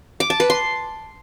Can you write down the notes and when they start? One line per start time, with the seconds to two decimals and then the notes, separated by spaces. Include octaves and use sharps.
0.20 D6
0.30 A5
0.40 B4
0.50 C6